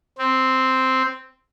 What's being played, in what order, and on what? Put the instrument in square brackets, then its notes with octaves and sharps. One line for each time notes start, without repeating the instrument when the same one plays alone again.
[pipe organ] C4